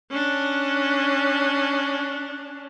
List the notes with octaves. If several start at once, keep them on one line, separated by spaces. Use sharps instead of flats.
C#4 D4